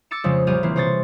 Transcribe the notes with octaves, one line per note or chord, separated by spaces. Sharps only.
D6 E6 A6 C#7 E7
F2 C#3 F3 G#3
A#1 G3 G4 G#4 F6 D#7
E3 A#3 C4
C3 G#4 C5 C#5 A6